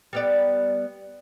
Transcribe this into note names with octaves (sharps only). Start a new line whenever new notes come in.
G3 B3 D5